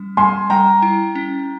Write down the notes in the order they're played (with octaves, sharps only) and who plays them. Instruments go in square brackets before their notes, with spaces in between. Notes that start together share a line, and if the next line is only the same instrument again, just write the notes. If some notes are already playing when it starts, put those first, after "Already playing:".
Already playing: [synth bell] G3 C#4
[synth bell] G3 [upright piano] G#5 C6
[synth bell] G3 [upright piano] G5 A#5
[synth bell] E4
C#4